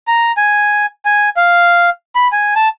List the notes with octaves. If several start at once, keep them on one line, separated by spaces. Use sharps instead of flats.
A#5
G#5
G#5
F5
B5
G#5
A5